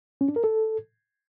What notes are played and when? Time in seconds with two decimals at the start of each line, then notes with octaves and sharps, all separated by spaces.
0.21 C#4
0.28 D4
0.36 A#4
0.44 A4